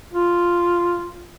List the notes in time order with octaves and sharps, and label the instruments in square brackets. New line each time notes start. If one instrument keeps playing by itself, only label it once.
[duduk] F4